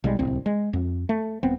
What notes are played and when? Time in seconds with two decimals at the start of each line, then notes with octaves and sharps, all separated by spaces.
0.04 B1 G3 G#3
0.19 D1 C2 C4
0.46 G#3
0.73 F2
1.09 A3
1.43 D#1 B3 C4